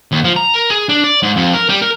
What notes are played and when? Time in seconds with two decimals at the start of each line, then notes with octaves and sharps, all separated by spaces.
0.12 D#2
0.24 F3
0.36 A#5
0.54 A#4
0.70 G#4
0.89 D4
1.04 D5
1.23 G#2
1.36 F2
1.54 A#4
1.69 G3
1.82 A#4